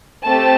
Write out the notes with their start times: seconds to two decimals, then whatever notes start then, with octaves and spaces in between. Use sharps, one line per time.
0.25 A3 C4 G4 A5